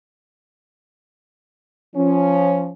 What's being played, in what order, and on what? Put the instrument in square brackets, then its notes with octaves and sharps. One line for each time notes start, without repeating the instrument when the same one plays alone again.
[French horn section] F3 C#4